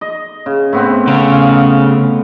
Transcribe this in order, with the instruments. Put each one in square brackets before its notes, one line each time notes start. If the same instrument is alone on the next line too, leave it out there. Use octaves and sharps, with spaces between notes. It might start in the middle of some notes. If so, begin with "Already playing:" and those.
[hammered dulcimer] D#5
C#3
A2 B3 C4
[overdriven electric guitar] C#3
[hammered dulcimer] F5